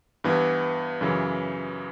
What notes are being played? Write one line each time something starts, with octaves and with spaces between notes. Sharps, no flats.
G2 E3 B3
F#2 C#3 E3